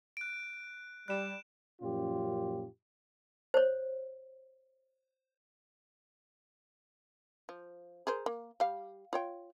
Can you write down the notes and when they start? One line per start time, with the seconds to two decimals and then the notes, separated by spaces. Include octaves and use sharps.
0.17 F#6 D7
1.08 G3 F#6 E7
1.81 F#2 A#2 F3 C#4 F4 G4
3.54 C5 C#5
7.49 F3
8.07 G#4 A#4 C5
8.26 A#3
8.60 G3 F5
9.13 F4 C#5 G5